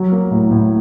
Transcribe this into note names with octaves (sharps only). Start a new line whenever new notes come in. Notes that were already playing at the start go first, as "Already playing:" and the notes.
Already playing: F#3
A#3
A2
A2